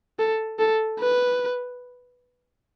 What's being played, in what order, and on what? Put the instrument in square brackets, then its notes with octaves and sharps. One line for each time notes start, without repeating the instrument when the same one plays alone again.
[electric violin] A4
A4
B4